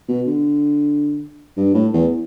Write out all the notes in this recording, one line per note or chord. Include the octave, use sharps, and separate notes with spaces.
B2
D3
G2
A2
E2